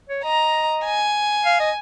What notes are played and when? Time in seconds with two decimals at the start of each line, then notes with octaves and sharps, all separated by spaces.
0.09 C#5
0.24 D#5 A#5
0.85 G#5
1.45 F5
1.60 D#5